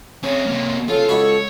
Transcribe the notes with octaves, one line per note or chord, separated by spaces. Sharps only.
C4 C#4 G#4
C3 A#3
C#3 F4 A4
C#2 F#4 C#5 B5